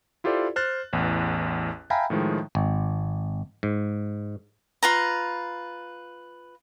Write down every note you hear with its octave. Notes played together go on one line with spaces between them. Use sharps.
E4 F4 G4 A4 C5 D5
C5 F6 F#6 A6
A1 E2
E5 F5 G5 G#5 A#5 B5
A2 D#3 F3 G#3
G#1
G#2
F4 B4 A#5